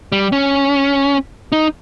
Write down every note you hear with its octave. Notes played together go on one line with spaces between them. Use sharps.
G3
C#4
D#4